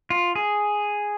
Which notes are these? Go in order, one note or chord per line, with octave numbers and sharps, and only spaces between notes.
F4
G#4